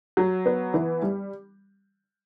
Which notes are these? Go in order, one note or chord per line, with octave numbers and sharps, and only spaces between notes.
F#3
B3
E3
G3